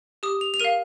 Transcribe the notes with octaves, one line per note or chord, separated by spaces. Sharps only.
G4 D#6
F7
F7
A#4 F5 D#7